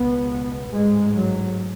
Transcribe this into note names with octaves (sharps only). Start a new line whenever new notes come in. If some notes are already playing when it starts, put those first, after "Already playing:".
Already playing: C#2 B2 B3
A1 G#2 G#3
F#3